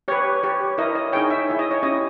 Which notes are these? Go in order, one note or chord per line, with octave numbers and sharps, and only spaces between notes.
G4 B4 C#5
G4 C#5
E4 A#4 C#5 D#5
D#5
D#4 G#4 C#5 G5
E5
E4 G#4 C#5
D#5
C#5
C#4 E4 G4 D#5